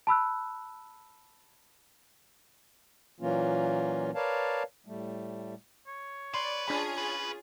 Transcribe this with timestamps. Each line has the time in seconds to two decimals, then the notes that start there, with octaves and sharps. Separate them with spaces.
0.07 A5 B5 E6 F#6
3.20 A#2 E3 F#3 A#3 C#4 F4
4.15 A#4 B4 C#5 D5 F5 A5
4.86 A2 G3 A3
5.87 C#5
6.34 B4 D5 C6
6.68 C#4 D4 F4 G#4 C#5 B5
6.98 B4